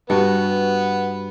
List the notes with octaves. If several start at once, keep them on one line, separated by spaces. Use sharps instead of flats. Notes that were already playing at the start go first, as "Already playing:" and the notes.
G2 B3 F#4